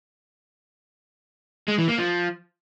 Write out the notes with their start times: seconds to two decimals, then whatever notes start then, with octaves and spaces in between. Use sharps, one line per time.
1.68 G#3
1.78 E3
1.88 A#3
1.98 F3